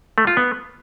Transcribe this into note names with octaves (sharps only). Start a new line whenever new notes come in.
A3
F4
B3